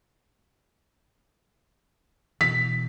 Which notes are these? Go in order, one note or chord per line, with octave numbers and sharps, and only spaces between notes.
B2 E3 B6